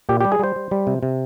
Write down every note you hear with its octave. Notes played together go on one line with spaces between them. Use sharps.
A#2 G4
G3 G4
G#4
G3 C5
G3
G3
C3
C3